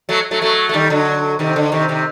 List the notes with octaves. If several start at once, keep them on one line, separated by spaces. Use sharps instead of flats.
F#3 A3
F#3 A3
F#3 A3
A3
D#3 G3
D3 F#3
C3 D#3
D3
C3 D#3
C3 D#3